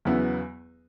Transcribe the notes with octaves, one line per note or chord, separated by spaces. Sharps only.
E2 C#3 F#3 B3 E4